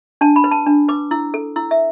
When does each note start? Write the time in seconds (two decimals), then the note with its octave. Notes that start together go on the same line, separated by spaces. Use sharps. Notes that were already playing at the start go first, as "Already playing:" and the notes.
0.21 D4 A5
0.36 B5
0.44 B4
0.51 A5
0.67 D4
0.88 B4 D6
1.11 E4 E6
1.34 A4
1.56 E4 E6
1.71 E5